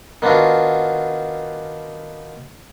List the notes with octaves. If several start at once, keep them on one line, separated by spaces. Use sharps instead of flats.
D#3 B3 D4 F4 F#4